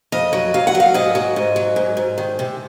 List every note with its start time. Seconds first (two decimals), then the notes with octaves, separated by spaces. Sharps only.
0.12 F2 D#5
0.33 F#3
0.54 F#3 F5
0.67 F#5
0.75 F#3
0.80 F5
0.94 G#2 D#5
1.15 F#3
1.36 G#2
1.56 F#3
1.76 G#2
1.97 G#2
2.18 D#3
2.39 C3